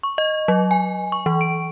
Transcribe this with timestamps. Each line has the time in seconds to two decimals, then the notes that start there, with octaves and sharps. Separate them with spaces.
0.03 C#6
0.18 D#5
0.48 F#3
0.71 G#5
1.12 C#6
1.26 E3
1.41 D7